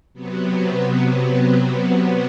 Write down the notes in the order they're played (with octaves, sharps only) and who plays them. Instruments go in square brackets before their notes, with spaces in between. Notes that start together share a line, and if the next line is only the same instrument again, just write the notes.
[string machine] C3 F#3 B3